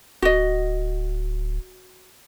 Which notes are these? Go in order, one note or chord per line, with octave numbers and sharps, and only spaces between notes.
D1 F#4 D#5